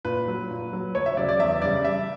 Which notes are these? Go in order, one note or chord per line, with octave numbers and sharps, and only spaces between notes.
A#2 B4
F#3
A#2
F#3
D2 C#5
E5
C#3 F#3 D5
D5
E2 E5
C#3 G3 D5
G2 E5